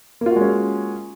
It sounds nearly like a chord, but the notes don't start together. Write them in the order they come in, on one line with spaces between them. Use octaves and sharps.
A#3 F4 F#4 G#3 C#4